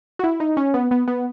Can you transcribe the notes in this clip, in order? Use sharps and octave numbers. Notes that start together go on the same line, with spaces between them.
F#4
E4
D#4
C#4
B3
B3
B3